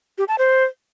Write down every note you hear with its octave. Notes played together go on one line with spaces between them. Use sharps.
G4
A5
C5